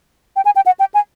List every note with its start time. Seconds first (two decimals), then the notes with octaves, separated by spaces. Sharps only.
0.36 G5
0.45 G#5
0.56 G5
0.66 F#5
0.80 G5
0.94 G#5